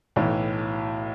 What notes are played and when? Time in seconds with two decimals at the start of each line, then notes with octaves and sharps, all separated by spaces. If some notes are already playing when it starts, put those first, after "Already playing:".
0.16 B1 A2 E3